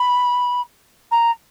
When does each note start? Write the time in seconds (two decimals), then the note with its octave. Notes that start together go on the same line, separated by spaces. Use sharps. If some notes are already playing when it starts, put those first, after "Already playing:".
Already playing: B5
1.11 A#5